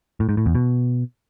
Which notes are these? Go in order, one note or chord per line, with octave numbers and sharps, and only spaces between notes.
A2
G#2
A2
E2
B2